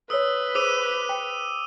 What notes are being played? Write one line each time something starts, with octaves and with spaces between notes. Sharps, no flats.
A4 B4 C#5 D#6 E6
G#4 C5 D6 E6 D#7
G5